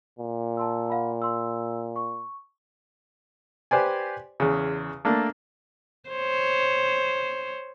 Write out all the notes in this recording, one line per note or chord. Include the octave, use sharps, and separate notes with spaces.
A#2
A5 C6 E6
F5 F#5 B5
C6 E6
C#6
G4 B4 C5 D5 G#5
E2 C#3
A3 A#3 D4
C5 C#5